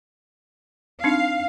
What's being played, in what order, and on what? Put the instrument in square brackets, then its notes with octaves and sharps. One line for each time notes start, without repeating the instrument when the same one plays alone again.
[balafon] C4 D4 D#4 [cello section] F5